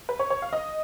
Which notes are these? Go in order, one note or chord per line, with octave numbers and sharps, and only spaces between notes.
B4
C#5
C#5
F5
D#5